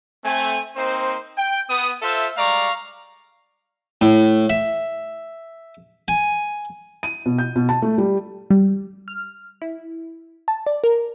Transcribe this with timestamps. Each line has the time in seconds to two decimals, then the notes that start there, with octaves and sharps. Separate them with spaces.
0.25 A3 C4 G#5
0.76 A#3 C4 D#4 C5
1.38 G5
1.70 B3 D#6
2.02 F4 A4 C5 E5
2.37 G3 G#3 D5 F5 A#5 C#6
4.01 A2
4.50 E5
6.08 G#5
7.03 D#7
7.26 B2
7.38 G6
7.56 B2
7.69 A5
7.82 A3
7.98 G3
8.50 G3
9.08 F6
9.62 E4
10.48 A5
10.66 D5
10.84 A#4